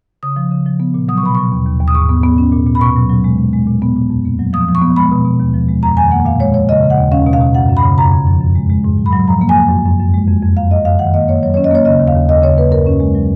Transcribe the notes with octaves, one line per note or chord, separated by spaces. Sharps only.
C#3 D#6
F3
C#3
F3
B3
A#2
F#3 D#6
C#6
B2 B5
F#3 C#6
D#2
D#2
D#2
D#6
G#2 C#6
B3
B3
C#4
A#2
A#2
B5
B2 C#6
F#3
F#3
G#3
G#3
G#3
A#2
B3
A#2
F2
A#3
F#3
F3 D#6
F3
C#6
B3
G#3 B5
B2
B2
D#2
F3
G#3
F2 A#5
D#3 G#5
A#3 F#5
A#2 F5
G#3 C#5
F3 C#5
C#3 D#5
C#3
F#5
D#2
C#4 F5
B2
F5
B2
F#2 F#5
F#2
B5
C#3
F2 A#5
F2
F3
F#2
G#3
G#3
G#2
F#3
B5
F#3
F3 A#5
A#3
G#5
F2
F#2
F#2
F#2
G#3
F2
F2
F#2 F5
F#2 D#5
F#2 F5
D#3 F#5
A#3 D#5
A#3 C#5
F#3 C#5
C#5
C#4
D#5
A#3 C#5
C#3 D#5
D#2
F5
D#2
D#2 D#5
C#3 C#5
A#3 B4
F#2 A#4
C#4
G#3
F#3